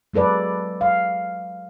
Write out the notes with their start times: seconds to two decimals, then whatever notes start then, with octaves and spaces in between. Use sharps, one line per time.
0.14 F#3 G#3 A4 B4 D5
0.81 F5